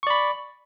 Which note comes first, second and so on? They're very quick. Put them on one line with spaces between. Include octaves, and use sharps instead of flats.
C#6 D5 B5